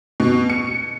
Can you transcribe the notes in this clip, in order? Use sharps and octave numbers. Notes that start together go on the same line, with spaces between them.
B2
C#7